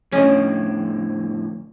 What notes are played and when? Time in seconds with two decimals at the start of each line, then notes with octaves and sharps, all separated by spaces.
0.12 F2 A2 D3 C#4 D#5